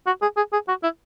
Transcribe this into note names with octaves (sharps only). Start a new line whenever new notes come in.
F#4
G#4
G#4
G#4
F#4
E4